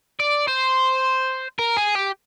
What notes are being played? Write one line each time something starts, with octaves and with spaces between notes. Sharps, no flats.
D5
C5
A#4
G#4
G4